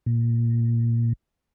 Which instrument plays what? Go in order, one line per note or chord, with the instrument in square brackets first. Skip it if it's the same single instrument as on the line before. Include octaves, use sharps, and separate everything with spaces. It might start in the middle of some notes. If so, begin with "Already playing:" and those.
[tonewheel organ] A#2